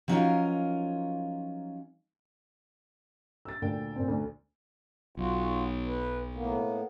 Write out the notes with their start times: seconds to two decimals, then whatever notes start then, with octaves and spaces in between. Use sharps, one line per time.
0.08 F3 F#3 C#4 D#4 F4 A#4
3.45 E6 A6
3.62 D2 A#2 G5
3.96 A#2 C4
4.08 D2
5.17 B1 F4 F#4
5.87 B4
6.35 A2 A#3 B3